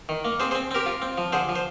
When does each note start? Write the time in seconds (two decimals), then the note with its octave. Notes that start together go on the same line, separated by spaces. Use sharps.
0.09 D#3
0.25 A#3
0.40 C4 G#4 C5
0.51 G#4 C5
0.55 C4
0.71 C4 G4 A#4
0.86 F4
1.02 C4
1.18 F3
1.32 D3 G#4 C5
1.49 F3
1.55 C5